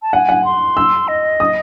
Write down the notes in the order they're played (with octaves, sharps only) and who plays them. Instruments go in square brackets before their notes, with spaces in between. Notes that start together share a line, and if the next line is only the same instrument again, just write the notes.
[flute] A5
[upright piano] F#5 [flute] G#5
[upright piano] F#5
[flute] C6
[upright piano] E6
[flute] D#5
[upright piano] D#6